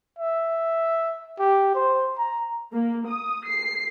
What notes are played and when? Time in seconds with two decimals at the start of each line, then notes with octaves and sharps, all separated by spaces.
0.19 E5
1.39 G4
1.75 C5
2.18 A#5
2.73 A#3
3.08 D#6
3.46 C7